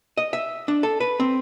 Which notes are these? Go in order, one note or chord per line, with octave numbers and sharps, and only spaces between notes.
D#5
E5
D4
A4
B4
C4